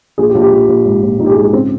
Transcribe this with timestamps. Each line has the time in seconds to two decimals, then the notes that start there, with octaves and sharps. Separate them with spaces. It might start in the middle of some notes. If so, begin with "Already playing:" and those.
0.18 A#1 G#4
0.29 G4
0.35 A#1
0.41 G4
0.52 A#1
0.68 A#1
0.86 G#2
1.03 A#1
1.19 A#1 D#4
1.26 G4
1.31 G#4
1.36 G#2
1.41 G4
1.53 C#3 C4